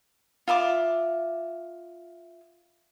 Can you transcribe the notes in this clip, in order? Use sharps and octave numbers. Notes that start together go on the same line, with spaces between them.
F4 E5 A#5 D6